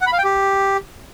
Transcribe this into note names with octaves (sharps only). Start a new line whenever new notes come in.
F#5
B5
F5
G5
G4